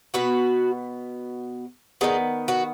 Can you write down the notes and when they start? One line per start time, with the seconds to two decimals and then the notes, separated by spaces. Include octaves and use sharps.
0.14 B2 B3 F#4 B4
2.01 D#3 F#3 B3 D#4 G#4
2.48 F#4 B4